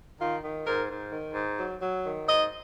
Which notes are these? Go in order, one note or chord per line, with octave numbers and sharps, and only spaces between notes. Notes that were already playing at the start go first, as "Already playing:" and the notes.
D#3 F4
D#3
G#2 A#4
G#2
D#3
G#2
F#3
F#3
D#3
G#2 D#5